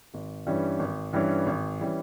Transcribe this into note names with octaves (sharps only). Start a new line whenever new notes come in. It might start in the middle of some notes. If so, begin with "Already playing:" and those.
G#1
G2 E3 G3 C#4
G#1
G2 E3 G3 C#4
G#1
E3 G3 C#4